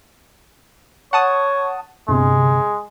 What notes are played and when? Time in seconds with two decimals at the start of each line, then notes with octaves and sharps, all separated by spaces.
1.13 C#5 F#5 A5 D#6
2.08 G1 C3 G#3